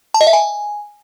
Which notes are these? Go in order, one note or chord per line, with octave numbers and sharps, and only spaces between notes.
A5
D#5
E5
G#5